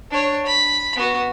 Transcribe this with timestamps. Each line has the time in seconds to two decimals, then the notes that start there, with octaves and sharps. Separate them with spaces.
0.11 D4 C#5
0.46 B5
0.96 B3 F#4